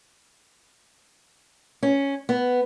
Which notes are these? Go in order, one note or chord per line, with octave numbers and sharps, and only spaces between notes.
C#4
B3